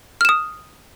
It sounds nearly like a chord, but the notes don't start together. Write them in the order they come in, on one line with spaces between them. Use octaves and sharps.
F6 E7 D#6